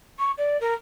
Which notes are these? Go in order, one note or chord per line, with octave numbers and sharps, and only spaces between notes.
C#6
D5
A#4